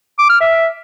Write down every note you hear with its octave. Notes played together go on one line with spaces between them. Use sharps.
D6
F6
E5